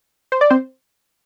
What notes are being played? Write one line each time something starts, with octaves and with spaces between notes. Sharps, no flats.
C5
D5
C4 C5